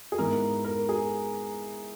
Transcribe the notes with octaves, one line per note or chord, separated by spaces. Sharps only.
G#4
G#2 E3 B3 A#4
A#4
G#4